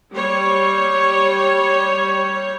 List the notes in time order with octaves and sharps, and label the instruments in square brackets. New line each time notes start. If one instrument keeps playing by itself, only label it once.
[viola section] G3 C#5